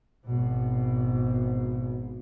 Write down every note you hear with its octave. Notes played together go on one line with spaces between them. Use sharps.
G#1 B2